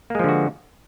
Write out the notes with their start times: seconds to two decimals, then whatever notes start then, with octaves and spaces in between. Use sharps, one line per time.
0.10 A#3
0.15 G#3
0.19 F3
0.24 D3
0.29 F#4